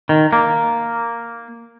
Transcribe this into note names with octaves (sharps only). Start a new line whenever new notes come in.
D#3
A#3